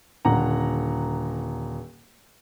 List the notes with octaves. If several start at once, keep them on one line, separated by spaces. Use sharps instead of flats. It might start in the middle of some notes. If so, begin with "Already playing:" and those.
D#1 D3 F#5 A#5